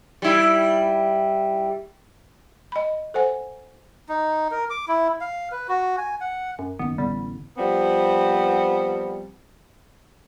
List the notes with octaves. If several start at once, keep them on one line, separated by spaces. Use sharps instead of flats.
G3 E4
D#5 B5
A4 C5 F#5 G#5
D#4
A#4
D6
E4
F5
B4
F#4
G#5
F#5
F#2
F#1 D#3 B3
A1 D3 G3 B3
F3 G3 B3 C4